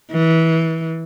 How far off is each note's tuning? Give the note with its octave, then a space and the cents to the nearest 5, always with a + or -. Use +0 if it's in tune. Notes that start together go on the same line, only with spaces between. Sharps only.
E3 -20